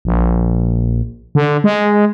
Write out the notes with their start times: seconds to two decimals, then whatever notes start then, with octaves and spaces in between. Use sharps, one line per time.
0.05 A#1
1.35 D3
1.64 G#3